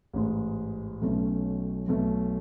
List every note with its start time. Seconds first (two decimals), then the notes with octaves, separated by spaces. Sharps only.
0.13 A1 G#2 G#3
1.02 B1 B2 A3 C#4
1.88 B1 B2 A3